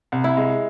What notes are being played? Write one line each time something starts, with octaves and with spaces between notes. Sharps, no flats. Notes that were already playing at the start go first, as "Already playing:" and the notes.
C2
E4
G#3